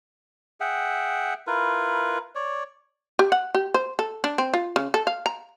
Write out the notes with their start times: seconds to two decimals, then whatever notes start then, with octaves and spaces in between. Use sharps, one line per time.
0.60 G#4 E5 F#5 G5
1.47 E4 F4 A#4 B4
2.35 C#5 D5
3.19 G4
3.32 F#5
3.55 G4
3.74 C5
3.99 A4
4.24 D4
4.38 C4
4.54 F4
4.76 C#3
4.94 A4
5.07 F5
5.26 A#5